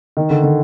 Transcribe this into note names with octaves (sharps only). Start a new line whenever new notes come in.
D#3
D3
D3